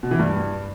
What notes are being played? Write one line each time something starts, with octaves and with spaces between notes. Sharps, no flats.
B2
E3
G2